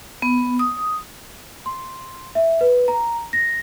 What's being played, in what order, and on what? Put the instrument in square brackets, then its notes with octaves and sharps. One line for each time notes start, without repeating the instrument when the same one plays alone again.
[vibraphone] B3
D#6
[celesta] C6
E5
B4
A#5
A#6